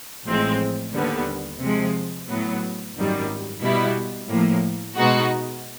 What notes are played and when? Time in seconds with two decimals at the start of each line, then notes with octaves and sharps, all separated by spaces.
0.26 A1 A2 F3 G#3 C4
0.93 D#2 D3 G3 B3
1.61 C3 F3 G#3
2.28 A2 F#3 B3
2.95 G#1 F#2 D#3 G3
3.62 B2 G3 B3 E4
4.29 A2 F3 A#3
4.97 B2 G#3 B3 D#4 F#4